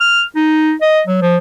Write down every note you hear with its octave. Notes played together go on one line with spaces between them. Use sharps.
F6
D#4
D#5
F#3
F3